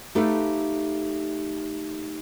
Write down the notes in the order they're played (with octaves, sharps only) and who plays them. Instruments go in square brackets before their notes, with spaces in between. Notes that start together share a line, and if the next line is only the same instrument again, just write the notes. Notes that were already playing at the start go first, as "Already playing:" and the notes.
[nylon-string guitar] A3 D#4 G4 A4 B4 F5